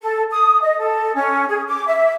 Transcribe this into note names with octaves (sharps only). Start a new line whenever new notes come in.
A4
D#6
D#5
A4
C#4
G#4
D6
E5